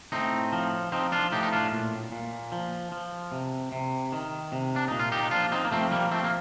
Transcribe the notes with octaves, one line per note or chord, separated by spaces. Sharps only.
A2 C4 D#4
F3
F3 C4 D#4
D4 F4
A2 D#4 G4
D#4
D4 F4
A#2
A#2
F3
F3
C3
C3
D#3
C3
D4
A#2 D#4
F4
D#4 G4
D#4
F3 D4 F4
C4 D#4
A#3
F3 A3 C4
G3 A#3
F3 A3 C4
A#3